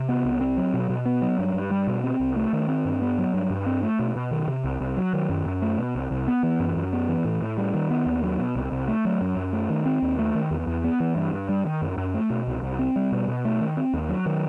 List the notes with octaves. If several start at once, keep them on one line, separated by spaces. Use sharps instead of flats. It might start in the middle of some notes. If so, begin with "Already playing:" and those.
Already playing: C3
B3
C2
C4
F#3
B2
B2
B3
F#3
G2
G2
G3
B2
C4
C2
A3
D#3
C4
G2
B3
F#3
G2
G2
C4
A3
B2
B2
D#3
C3
C2
C2
F#3
D#3
F#2
F#2
A3
B2
C2
C2
B3
E3
F#2
F#2
B3
E3
A2
A2
G3
D#3
B3
D#2
F#3
B2
C2
C2
A3
F#3
F#2
F#2
A3
D#3
C4
D#2
A3
D#3
E2
E2
B3
E3
G2
G2
G3
D#3
F#2
F#2
A3
B2
C2
C2
C4
G3
B2
B2
A3
D#3
C4
D#2
F#3
D#3